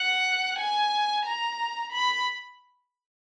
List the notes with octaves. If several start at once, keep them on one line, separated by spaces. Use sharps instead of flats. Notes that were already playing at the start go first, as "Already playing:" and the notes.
Already playing: F#5
G#5
A#5
B5